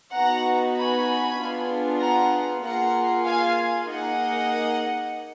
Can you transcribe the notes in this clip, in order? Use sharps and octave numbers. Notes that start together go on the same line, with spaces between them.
B3 D#4 F#4 F#5 A#5
G#5 B5
B3 D4 F4 G#4
F#5 A#5
A#3 F4 G#4 F#5 A#5
F5 G#5
A#3 D#4 G#4 D#5 F#5